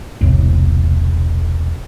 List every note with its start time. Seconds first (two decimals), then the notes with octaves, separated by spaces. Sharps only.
0.21 E1 C2 A2